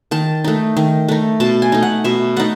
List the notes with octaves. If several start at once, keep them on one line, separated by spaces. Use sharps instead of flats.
D#3 A5
A3 D#4
D#3
A3 D#4
B2 A5
G#5
A3 D#4
F#5
B2 E5
A3 D#4 F#5